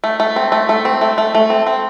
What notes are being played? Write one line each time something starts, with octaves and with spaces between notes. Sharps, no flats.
A3
A3
C4
A3
A3
C4
A3
A3
A3
C4
C4